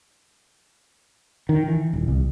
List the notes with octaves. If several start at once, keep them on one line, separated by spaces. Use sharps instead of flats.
D#3
E3
D#1
C2